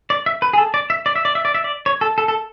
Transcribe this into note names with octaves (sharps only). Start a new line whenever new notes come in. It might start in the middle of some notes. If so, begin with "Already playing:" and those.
D5
E5
B4
G#4
A4
D5
E5
D5
E5
D5
E5
D5
E5
D5
C#5
A4
A4
A4